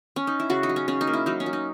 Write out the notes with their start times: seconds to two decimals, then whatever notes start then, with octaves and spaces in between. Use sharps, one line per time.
0.16 C#4
0.27 D#4
0.40 E4
0.50 C#3 F#4
0.63 D#4
0.69 F#3
0.76 C#4
0.88 C#3 C#4
1.01 D#4
1.07 A#3
1.13 E4
1.26 F#3 D#4
1.40 C#4
1.46 F#3
1.53 D#4